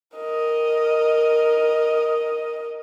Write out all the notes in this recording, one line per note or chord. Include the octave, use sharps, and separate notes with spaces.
A#4 D#5